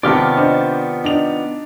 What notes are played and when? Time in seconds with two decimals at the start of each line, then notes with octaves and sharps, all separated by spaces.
0.03 C3 D#3 B3 F4 D5 A5 D6 F6
0.37 D4 C5 D#5
1.04 D4 D#4 F7